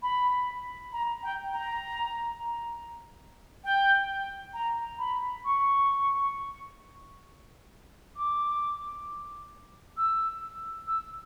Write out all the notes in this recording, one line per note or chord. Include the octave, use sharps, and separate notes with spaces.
B5
A#5
G5
A#5
G5
A#5
B5
C#6
D6
E6
E6